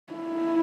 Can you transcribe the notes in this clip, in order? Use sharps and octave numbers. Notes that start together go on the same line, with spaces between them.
E4